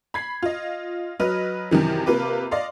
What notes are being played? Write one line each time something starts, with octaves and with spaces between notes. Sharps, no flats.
B5 G#6 C7
F4 D#5
F#3 B4 D#5 F6
F#2 C3 D#3 E3
C3 A#3 F4 B4 D6
D5 D#5 F5 C6